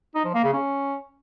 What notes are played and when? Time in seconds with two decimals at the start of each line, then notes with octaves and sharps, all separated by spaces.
0.15 D#4
0.25 F3
0.34 A#3
0.44 C#3
0.53 C#4